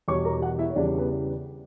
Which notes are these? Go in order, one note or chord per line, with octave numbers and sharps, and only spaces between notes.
E2 B2 G3 C#5 C#6
A#4 A#5
F#4 F#5
E4 E5
C#5
E2 C#3 E3 G3 D4 D5
B3 B4